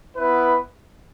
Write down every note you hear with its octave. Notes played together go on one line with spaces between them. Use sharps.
B3 E4 B4